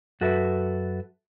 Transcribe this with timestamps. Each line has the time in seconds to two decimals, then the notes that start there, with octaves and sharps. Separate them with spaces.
0.21 F#2 F#4 A4 B4 E5